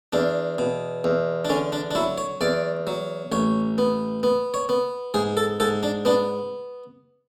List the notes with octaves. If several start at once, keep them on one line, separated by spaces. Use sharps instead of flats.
E2 D4
B2
E2
D4
D3 C#4
D4
D4
F#3 E4
C#5
E2 D5
F#3
A1 C#5
B3
B3
C#5
B3
G#2 G#4
A4
G#2 A4
D4
B3 D4